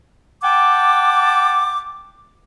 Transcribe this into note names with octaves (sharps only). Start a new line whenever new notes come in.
F#5 G5 A5 D6